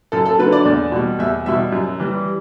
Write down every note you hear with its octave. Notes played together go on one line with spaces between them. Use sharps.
F#2 A4
A4
D3 F#3 B4
D5
E2 D5
B2 G3
E2 E5
B2 G3 E5
F#2
E3 G3